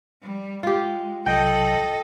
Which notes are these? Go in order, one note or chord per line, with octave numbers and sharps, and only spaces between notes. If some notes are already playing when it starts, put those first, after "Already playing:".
G3
G#3 F4 G4
B1 C3 F#3 A4 D#5 G5